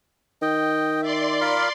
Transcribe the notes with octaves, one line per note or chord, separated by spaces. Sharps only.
D#3 D#5 G5
D5 E5 C6
F4 A#4 B5